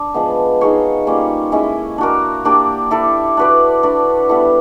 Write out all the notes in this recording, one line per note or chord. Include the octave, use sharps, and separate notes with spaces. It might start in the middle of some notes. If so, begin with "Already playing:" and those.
Already playing: D4
F3 G#3 B3
D#4 G#4 C#5 F5
G3 A#3 C#4 F4
G#3 C#4 E4
D4 F#4 A#4
A#3 D4 G4
E4 A4 D5
D4 F#4 B4 D5
D4 F#4 B4
G3 B3 E4 A4